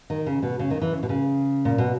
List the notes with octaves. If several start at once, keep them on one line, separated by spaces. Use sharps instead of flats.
D#3
C#3
B2
C#3
D#3
E3
C#3
B2
C#3
A#2
B2